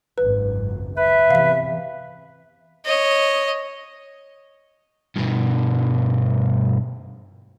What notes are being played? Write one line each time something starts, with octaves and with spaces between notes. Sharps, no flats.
G#1 C#2 F#2 B4
B4 E5
E2 C3 E3 F5 B6
C#5 D#5
G2 B2